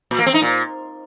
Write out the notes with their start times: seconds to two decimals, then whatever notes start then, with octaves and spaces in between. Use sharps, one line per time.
0.11 A#2
0.19 A#3
0.26 C4
0.34 D#4
0.42 A#2